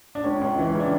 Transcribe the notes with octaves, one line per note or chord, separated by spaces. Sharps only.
D4
C#2 C#4
C#2
E3
C#3 D4